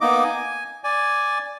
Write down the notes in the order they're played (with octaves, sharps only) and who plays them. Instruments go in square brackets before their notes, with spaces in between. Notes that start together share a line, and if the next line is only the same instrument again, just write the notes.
[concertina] A#3 B3 D#4 D#5 D6
G#5
D5 G#5